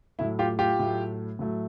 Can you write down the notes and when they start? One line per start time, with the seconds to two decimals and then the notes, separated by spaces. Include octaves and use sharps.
0.19 A2 F#3 A3 E4
0.39 F4 G4
0.59 F4 G4
0.79 A2 F#3 A3
1.39 A2 F#3 A3